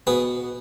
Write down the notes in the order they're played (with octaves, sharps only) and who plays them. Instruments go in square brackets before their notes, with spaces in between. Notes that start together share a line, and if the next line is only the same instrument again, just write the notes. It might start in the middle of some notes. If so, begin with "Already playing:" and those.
[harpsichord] B2 G#4 B4